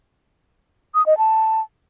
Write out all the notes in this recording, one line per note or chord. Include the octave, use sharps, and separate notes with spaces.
D#6
D#5
A5